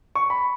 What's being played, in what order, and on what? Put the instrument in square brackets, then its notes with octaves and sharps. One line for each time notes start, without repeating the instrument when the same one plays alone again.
[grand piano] C#6
B5